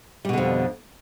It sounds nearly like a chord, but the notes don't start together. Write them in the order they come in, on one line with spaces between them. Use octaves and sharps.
G3 B2 D3 F2